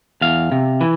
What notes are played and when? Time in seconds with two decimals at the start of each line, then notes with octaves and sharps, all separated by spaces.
0.21 E2 F5
0.52 C3
0.81 E3